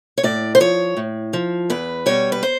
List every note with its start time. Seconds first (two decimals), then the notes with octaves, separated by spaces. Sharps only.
0.18 C#5
0.23 A2 D5
0.55 C5
0.60 F3 C#5
0.97 A2
1.33 F3
1.70 E2 B4
2.06 B2 G3 C#5
2.32 B4
2.43 C5